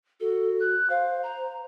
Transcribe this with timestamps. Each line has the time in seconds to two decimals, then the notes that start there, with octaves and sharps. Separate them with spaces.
0.20 F#4 A4
0.60 F#6
0.90 C5 F5
1.23 A#5